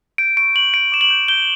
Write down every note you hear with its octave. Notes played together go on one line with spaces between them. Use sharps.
G6 D7
C#6 D7
C#6 F#7
G6 D7
D6 E7
F#7
G6
G6 G7